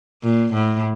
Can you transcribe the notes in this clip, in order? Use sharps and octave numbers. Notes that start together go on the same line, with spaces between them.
A#2
A2